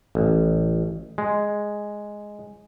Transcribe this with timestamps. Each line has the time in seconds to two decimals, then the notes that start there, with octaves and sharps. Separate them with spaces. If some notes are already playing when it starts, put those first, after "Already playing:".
0.15 A1
1.18 G#3